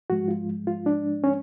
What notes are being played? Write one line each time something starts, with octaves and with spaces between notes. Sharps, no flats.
G#2 F3 G#3 F#4
F4
F4
D4
C#4